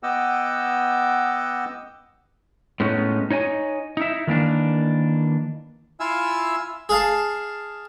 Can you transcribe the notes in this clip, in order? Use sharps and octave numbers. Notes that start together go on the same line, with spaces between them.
B3 D#5 F#5 G5 D6 E6
A2 G#3 B3 C#4 D#4
D#4 C#5 D#5 G#5
D#4 E4 E5
D#3 E3 A#3 D4
E4 F4 E5 F5 G#5 E6
G#4 F5 A5